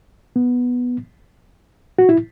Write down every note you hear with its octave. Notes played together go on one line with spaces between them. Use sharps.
B3
F#4
E4